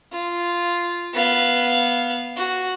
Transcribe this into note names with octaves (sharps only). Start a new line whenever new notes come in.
F4
B3 F5
F#4